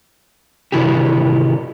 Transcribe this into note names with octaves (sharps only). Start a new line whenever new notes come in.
C3 D#3 E3 E4 F#4 G4